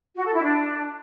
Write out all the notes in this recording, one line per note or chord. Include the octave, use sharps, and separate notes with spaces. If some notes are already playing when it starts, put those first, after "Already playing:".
F#4
A4
E4
D4